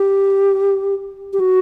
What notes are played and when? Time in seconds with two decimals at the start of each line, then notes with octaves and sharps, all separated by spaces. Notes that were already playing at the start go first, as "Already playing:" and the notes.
Already playing: G4
1.33 G4
1.40 F#4